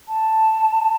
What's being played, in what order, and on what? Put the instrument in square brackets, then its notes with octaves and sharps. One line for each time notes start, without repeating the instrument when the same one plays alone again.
[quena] A5